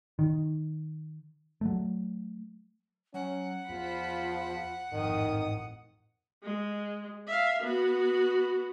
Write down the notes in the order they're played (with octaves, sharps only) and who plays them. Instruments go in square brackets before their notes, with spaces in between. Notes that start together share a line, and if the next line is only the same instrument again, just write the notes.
[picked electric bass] D#3
F#3 A3
[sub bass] F#3 [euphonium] C#4 [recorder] F#5
[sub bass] E2 [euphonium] F3 [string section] F4 C5 B5
[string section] A1 F2 D#6 [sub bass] G#2 [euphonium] D#3
[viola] G#3
E5 F5
B3 F#4